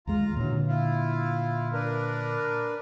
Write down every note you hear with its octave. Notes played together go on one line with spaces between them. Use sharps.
D#2 G#3 F4 A#5
A#2 D3 E3 F#3
E4 F4
D4 A#4 B4